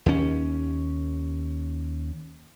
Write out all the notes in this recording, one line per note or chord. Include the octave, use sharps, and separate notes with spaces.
D#2 C#4